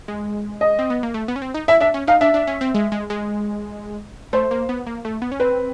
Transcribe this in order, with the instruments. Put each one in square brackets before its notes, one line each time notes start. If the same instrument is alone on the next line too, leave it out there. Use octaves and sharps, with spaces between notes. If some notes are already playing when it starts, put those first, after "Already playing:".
[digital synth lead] G#3
[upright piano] D#5
[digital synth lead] C4
B3
A#3
A3
B3
C#4
C4
D#4
[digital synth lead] E4 [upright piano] E5
[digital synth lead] D4 [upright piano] E5
[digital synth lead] C#4
[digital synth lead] D#4 [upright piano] F5
[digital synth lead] D4 [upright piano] E5
[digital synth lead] D4
C#4
C4
G#3
G#3
G#3
[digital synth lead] A3 [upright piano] C5
[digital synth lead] A#3
B3
A#3
A3
B3
C#4
[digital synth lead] C4 [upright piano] B4